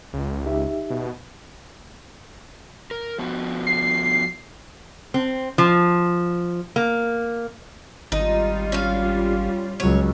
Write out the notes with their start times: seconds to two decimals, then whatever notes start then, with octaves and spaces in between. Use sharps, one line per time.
0.13 C#2
0.46 D#4 G4 E5
0.90 B2
2.91 A#4
3.19 F3 B3 F#4
3.67 C7
5.14 C4
5.58 F3
6.76 A#3
8.12 G#1 G3 D#4 F4
8.72 C#4 F5
9.80 C#2 F#3 C#5